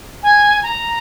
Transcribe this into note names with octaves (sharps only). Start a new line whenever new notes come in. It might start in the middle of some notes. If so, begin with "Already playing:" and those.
G#5
A#5